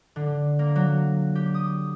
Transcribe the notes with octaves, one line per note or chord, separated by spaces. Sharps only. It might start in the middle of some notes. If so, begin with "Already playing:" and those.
D3
A#3
F#3
G4
D#6